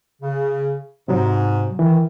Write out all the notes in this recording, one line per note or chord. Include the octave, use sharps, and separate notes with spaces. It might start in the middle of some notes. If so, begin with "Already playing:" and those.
C#3
G#2 C3 F#3
D#3 E3